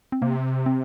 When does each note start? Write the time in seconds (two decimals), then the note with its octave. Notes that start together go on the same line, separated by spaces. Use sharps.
0.12 C4
0.21 C3 A#3
0.66 C4